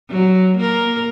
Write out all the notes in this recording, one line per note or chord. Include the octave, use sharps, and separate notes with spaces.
F#3
A#3 A#4